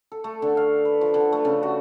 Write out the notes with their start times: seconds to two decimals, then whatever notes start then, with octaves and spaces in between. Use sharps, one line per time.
0.12 A4
0.24 A3
0.42 D3
0.57 F5
0.85 B4
1.01 F3
1.14 D3
1.33 A3
1.45 C#3
1.63 F#4